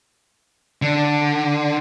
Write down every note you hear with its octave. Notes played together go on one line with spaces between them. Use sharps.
D3